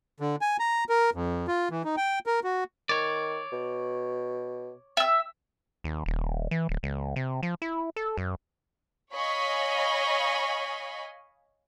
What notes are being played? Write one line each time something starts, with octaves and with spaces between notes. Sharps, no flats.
D3
G#5
A#5
A#4
F2
F4
E3
D#4
G5
A#4
F#4
D#3 C#5 D5
B2
E5 E6
D#2
D#1
E3
D1
C#2
C3
F3
E4
A4
F#2
C#5 D#5 F5 G#5 B5 C#6